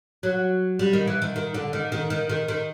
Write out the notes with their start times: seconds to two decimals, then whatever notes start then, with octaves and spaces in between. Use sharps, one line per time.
0.23 F#3
0.79 G3
0.93 D#3
1.07 E3
1.22 D#3
1.36 D#3
1.54 D3
1.73 D#3
1.92 D#3
2.10 D#3
2.30 D#3
2.48 D#3